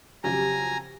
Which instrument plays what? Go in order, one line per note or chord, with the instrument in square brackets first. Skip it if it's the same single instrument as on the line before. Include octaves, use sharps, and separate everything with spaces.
[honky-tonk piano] F2 C#3 F#3 [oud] G4 [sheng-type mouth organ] G#5 A#5